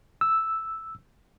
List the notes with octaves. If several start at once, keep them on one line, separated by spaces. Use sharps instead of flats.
E6